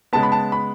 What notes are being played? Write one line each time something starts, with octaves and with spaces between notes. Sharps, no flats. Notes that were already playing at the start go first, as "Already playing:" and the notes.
C#3 G#3 B3 A5
B5
A5
B5